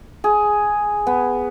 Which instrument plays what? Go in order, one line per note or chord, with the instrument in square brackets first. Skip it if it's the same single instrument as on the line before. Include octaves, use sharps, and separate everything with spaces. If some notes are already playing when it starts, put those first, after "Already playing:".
[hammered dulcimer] G#4
B3